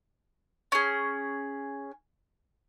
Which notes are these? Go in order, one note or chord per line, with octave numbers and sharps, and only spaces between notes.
C#4 G#4